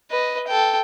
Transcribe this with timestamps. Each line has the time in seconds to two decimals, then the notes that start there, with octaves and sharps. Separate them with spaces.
0.11 B4 D#5
0.47 A4 G5